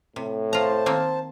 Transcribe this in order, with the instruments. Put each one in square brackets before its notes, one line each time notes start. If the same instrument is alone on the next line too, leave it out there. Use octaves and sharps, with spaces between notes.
[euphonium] A2 [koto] C3
[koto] F4 A#5 [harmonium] C5 A5
[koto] D#3 A#3 C4